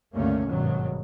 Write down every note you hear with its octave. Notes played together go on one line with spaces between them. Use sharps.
C#2 G2 D3 A3 A#3 C#4
G#1 G2 B2 D#3 F#3